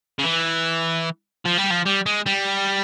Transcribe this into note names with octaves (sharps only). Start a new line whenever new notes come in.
C#3
E3
F3
G3
F3
G3
G#3
G3